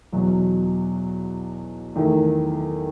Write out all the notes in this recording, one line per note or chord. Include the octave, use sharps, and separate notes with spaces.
E2 B2 F#3
E2 D#3 A3 E4